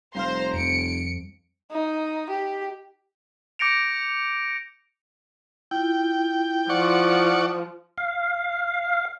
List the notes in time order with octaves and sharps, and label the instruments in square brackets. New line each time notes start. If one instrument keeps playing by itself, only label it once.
[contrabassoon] F1 [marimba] G3 F5 F6 [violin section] C5 A#5 C6
[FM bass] F2 [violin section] C#7 D7
[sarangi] D#4
G4
[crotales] D6 G6 A#6 C#7 D7 F7
[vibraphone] E4 F4 [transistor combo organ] G5
[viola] F3 [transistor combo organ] D5 F#5 C#6
[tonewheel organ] F5